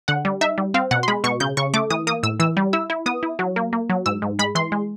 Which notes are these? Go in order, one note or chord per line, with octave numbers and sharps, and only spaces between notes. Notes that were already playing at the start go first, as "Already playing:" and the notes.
D3 F#5
G3
D#4 E5
G3
C4 F5
B2 F#5
C6
G#3 B5
B2 C#6
C#3 G6
C#3 C#6
A3 D6
E3 D#6
A#3 D#6
A2 E6
E3 E6
G3
E4 E6
E4
B3 D#6
E4
F#3
A#3
A#3
F#3
G#2 E6
G#2
G#3 B5
E3 C6
G#3